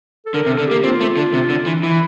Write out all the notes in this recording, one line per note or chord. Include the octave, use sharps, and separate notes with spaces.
A4
D3 A#4
C3
A4
D3
A#3 G4
C4 F4
A3
D3
C3
D3
E3
E3 E4